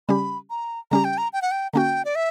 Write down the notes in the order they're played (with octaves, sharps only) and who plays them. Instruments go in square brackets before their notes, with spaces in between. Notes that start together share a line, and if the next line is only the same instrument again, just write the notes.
[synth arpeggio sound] C#3 G3 C#4 G4 [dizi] B5
[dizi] A#5
[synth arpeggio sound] C#3 G3 C#4 G4 [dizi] A#5
[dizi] G5
A#5
G5
F#5
G5
[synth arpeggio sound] D3 A#3 C#4 F#4 [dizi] G5 A#5
[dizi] D5
E5